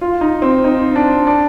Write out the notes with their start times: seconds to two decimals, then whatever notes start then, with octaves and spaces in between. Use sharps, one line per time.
0.01 F4
0.21 D#4
0.42 C4
0.64 D#4
0.96 D4
1.27 D4